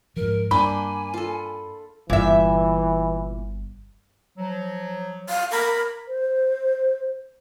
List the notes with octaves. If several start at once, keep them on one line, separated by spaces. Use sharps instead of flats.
G#2 F3 A#4
G2 A#3 D4 G5 G#5 B5
F4 A4
G1 A#2 E3 E5
F3 F#3
F5
A#4 A#5 B5
C5